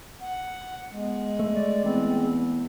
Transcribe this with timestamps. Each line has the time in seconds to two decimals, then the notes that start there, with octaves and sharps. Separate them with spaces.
0.22 F#5
0.91 G#3 B3
1.39 A3
1.54 D5
1.84 E2 C4